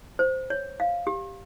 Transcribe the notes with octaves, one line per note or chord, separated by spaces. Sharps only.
C5
C#5
F5
G4